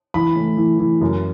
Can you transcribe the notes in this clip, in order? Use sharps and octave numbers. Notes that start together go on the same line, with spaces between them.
E3 B5
A2
E3
E3
F#2